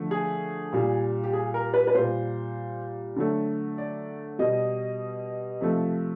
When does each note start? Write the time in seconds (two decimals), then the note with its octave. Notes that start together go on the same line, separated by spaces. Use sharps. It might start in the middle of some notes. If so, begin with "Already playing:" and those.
Already playing: D3 F3 A3
0.11 G#4
0.73 A#2 G3
1.24 G4
1.33 G#4
1.54 A#4
1.74 B4
1.87 B4
1.94 A#2 G3 C5
3.16 D3 F#3 A3
3.78 D5
4.39 B2 G3 D#5
5.61 C3 F3 A3